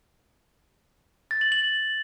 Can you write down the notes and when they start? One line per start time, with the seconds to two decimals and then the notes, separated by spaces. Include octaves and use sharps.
1.31 A6
1.41 F#7
1.52 F#7